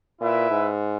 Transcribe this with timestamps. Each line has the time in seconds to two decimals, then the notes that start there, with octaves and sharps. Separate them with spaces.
0.21 A#2 E4 B4 E5
0.51 G#2